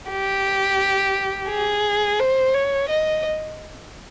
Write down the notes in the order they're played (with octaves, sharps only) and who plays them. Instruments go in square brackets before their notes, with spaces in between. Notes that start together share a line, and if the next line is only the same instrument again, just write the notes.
[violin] G4
G#4
C5
C#5
D#5